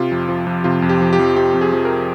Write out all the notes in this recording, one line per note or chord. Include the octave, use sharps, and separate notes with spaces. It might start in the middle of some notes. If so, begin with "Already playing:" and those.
Already playing: C3 F4
F2
F3
F2
C3 F4
F2
G4
F3
G4
F2
C3 G4
F2
G#4
F3
A#4